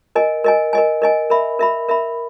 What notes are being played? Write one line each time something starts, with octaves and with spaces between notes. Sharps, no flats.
A#4 D#5 G#5
A#4 D#5 G#5
A#4 D#5 G#5
A#4 D#5 G#5
A#4 E5 B5
A#4 E5 B5
A#4 E5 B5